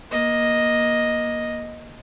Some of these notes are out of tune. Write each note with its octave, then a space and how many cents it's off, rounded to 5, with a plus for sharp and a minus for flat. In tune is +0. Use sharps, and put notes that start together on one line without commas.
A#3 +25 D#5 +0